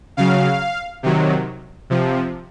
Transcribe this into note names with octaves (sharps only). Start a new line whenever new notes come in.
C#3 F#3 F5
C3 D#3 F#3
C3 F3